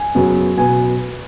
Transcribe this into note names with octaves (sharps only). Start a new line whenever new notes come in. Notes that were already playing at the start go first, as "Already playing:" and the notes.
Already playing: G#5
F#2 C#3 F#3 B3
B2 F#3 B3 G#5